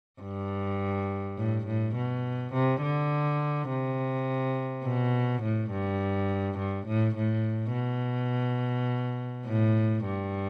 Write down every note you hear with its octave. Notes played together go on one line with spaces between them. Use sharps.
G2
A2
A2
B2
C3
D3
C3
B2
A2
G2
G2
A2
A2
B2
A2
G2